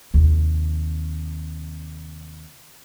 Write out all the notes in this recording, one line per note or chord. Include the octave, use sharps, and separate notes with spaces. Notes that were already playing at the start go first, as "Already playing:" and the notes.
D#2 C3